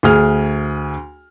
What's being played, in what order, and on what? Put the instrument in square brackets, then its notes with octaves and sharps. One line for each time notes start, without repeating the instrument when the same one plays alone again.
[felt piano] D2 G#4 F6